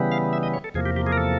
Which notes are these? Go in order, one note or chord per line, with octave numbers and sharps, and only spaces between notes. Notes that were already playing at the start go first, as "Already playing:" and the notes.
Already playing: C#3 E3 G3 B3
F5
E5
D#5
C#5
A4
E2 C3 F3 A#3 G#4
G4
G4
G#4
A#4
A4